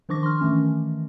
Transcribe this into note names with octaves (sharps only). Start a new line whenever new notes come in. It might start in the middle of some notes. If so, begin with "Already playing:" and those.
D#3 F3 D4 C#6 D6 A#6
C6 F6
D#3 E3 A3 C#4